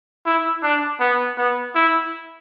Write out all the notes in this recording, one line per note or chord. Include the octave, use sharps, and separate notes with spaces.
E4
D4
B3
B3
E4